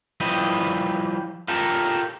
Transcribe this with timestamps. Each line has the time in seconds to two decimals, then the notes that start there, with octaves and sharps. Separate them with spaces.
0.20 F3 G3 E4 G4 B4 D#5
1.48 F4 G4 A4 A#4